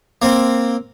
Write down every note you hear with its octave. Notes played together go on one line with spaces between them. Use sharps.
A#3 C4